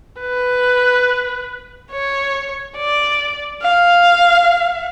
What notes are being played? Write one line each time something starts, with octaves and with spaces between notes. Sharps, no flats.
B4
C#5
D5
F5